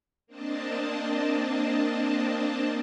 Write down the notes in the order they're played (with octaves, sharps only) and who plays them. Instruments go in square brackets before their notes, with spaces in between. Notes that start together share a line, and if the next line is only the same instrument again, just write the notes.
[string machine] A#3 C4 D4 D#5 A5